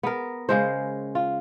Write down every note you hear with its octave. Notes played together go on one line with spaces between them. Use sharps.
B3 A#4
C#3 G#3 C5
F4